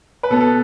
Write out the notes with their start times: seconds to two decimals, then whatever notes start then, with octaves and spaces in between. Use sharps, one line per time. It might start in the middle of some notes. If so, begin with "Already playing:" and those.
0.23 B4
0.30 B2 B3 A4
0.41 A4